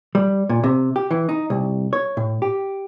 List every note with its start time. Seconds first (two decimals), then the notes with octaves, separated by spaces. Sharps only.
0.15 G3
0.49 A#2
0.64 C3
0.96 G4
1.11 E3
1.29 D#4
1.50 C2
1.93 C#5
2.17 A2
2.42 G4